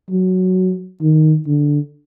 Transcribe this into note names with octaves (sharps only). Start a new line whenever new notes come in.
F#3
D#3
D3